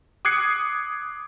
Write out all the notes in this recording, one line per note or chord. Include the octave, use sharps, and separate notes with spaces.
D6 D#6 F#6 G#6 C7 C#7